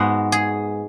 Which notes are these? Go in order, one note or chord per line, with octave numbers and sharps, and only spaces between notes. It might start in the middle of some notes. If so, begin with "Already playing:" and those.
Already playing: G#2 G#3 B3 F#4
G#4